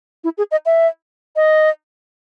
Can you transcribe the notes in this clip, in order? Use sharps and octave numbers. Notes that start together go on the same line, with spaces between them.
E4
G#4
D#5
E5
D#5